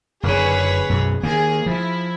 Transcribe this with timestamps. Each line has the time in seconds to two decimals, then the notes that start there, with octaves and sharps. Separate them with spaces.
0.23 F#1 D3 G#4 B4 C#5
0.89 B1 F#2
1.23 D#3 A#3 G#4
1.66 F3 E4